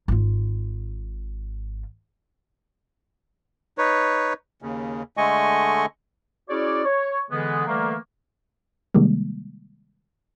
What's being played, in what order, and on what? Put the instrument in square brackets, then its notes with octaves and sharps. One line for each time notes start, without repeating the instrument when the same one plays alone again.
[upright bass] G#1 F4
[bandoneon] D#4 B4 C#5
D#2 C#3
D3 G#3 A3 D#5 G#5 C#6
[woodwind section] C#4 E4 F#4 G#4 C#5 D5
C#5
D3 E3 G#3 B3
D3 E3 G3 A3 A#3
[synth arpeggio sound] C3 D#3 G3 G#3 A#3